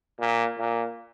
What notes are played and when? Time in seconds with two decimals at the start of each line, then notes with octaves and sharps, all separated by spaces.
0.19 A#2
0.58 A#2